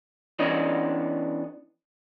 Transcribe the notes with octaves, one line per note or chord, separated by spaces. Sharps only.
E3 B3 C#4 D4 D#5